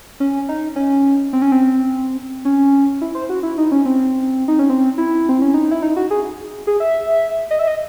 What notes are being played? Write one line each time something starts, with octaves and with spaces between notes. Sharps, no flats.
C#4
D#4
C#4
C4
C#4
C4
C#4
E4
C5
F#4
E4
D#4
C#4
C4
D#4
C#4
C4
E4
C4
C#4
D#4
E4
D#4
F#4
G#4
G#4
E5
D#5
E5
D#5